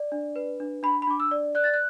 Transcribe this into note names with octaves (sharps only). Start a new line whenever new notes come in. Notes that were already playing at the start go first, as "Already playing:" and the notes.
Already playing: D5
D4
B4
D4
D4 B5
B5
D4 D6
E6
D5
D5 F#6
A6
F#6